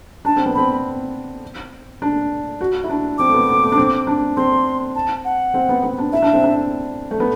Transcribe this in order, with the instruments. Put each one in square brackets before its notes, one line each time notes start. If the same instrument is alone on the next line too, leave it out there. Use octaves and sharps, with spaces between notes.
[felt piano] D4 [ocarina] A5
[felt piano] C4
B3
[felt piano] C4 [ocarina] B5
[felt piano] D4
F#4
E4
D4
[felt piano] C4 [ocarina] D6
[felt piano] A3
B3
B3
A3
D4
C4
D4
[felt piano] C4 [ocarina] C6
[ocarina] A5
F#5
[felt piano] C4
B3
B3
D4
[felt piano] E4 [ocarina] E5
[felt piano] D4
C4
D4
A3
B3